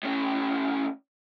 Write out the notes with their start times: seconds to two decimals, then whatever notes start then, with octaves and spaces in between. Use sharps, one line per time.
0.03 A2 C#4